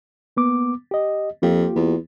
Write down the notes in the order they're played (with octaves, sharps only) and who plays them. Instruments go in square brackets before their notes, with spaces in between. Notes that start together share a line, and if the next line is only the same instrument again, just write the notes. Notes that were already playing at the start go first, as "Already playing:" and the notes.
[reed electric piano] A#3 B3 D6
G4 D#5
[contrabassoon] F2 [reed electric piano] A#3 F4 G4
[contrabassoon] E2